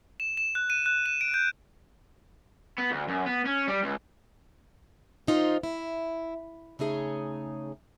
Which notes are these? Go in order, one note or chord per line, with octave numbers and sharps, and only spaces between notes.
E7
E7
F#6
D#7
F#6
E7
D7
G6
B3
D2
F#2
B3
C#4
G3
C#2
D#3 D#4 F4 C5
E4
C#3 A3 D#4 G#4 C#5 G#5